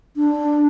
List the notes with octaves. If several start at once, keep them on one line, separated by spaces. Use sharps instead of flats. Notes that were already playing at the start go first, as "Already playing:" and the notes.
D4